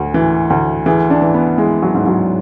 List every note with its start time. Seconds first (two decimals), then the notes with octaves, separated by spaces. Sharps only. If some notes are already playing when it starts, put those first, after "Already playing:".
Already playing: D2 F#4
0.14 E3
0.50 D2
0.86 E3 G#4
1.10 D4
1.22 E3
1.34 B3
1.58 E3 G#3
1.82 F#3
1.95 G#2
2.06 F#3